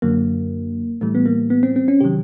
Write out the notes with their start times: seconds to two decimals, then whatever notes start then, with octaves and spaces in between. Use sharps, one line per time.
0.02 F#2 D3 F#3 A#3
1.01 A2 E3 G3 A3
1.15 B3
1.26 A#3
1.50 B3
1.63 C4
1.76 C4
1.88 C#4
2.01 C3 D#3 F#3 G4